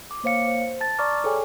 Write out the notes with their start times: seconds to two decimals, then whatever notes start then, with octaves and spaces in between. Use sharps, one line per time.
0.11 D6
0.24 A#3 C5 C#5 F5 C#7
0.47 C5
0.81 A5 A6
0.99 D5 A#5 C#6 D6 F6
1.24 G#4 A4 C#5 G5 G#5